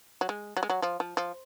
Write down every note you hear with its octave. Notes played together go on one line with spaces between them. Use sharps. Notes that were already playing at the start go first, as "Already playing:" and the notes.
F#3
G#3
F#3
G#3
F#3
F3
F3
F3